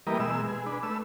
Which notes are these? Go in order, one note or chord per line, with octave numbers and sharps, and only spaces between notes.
E3 G3 A#3 A#4 B4 D#5
B2 G#3 E6
G#4
D4 B4
A3 B4 E6